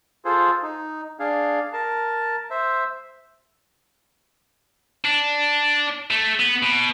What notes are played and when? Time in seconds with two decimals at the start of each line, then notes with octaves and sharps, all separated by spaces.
0.25 F4 G#4 A4 C5
0.62 D#4
1.19 D4 G#4 F5
1.73 A#4 A5
2.50 C5 E5
5.04 D4
6.10 A3
6.39 B3
6.62 B2